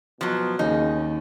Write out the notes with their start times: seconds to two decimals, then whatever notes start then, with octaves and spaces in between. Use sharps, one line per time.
0.21 B2 F3 F#3
0.59 D#2 C#3 D#4